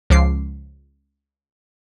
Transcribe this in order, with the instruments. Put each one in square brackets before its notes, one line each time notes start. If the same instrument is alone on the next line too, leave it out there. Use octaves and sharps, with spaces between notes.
[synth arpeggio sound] C#2 F3 D6 C7